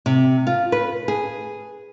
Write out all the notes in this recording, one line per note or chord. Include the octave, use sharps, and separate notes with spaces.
C3
F4
B4
G#4